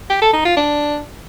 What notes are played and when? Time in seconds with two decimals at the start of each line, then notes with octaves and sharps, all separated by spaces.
0.10 G4
0.22 A4
0.33 D#4
0.45 F4
0.57 D4